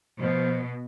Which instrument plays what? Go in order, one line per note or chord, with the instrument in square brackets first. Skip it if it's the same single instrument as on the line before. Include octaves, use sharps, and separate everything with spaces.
[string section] B2 [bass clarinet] F3